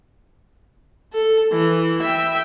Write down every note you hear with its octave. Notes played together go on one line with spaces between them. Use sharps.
A4
E3
E5 G5